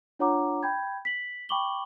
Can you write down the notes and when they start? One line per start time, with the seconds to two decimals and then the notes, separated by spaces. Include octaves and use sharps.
0.19 D4 F4 C#5 F#5 A#5 D6
0.63 G5 B5 G6 G#6
1.05 B6 F#7
1.49 G5 B5 C#6 D6 F#7 G7